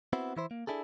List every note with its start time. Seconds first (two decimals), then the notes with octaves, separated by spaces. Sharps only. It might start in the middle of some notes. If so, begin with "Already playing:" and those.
0.13 B3 C4 E4 F#4
0.37 E3 E4 C5
0.51 A#3
0.67 D4 E4 G#4 A4